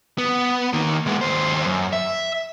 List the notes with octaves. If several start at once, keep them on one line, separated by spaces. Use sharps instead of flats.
B3
D#3 A#3
G#3 B3
D#2 C5
F#2
E5